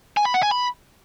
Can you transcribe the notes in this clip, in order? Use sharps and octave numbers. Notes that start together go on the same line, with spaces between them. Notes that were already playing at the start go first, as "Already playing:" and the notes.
G#5
B5
F#5
G#5
B5